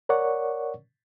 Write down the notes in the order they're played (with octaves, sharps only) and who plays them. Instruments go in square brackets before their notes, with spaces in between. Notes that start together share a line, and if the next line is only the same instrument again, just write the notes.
[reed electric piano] A#4 C#5 D5 F#5 C#6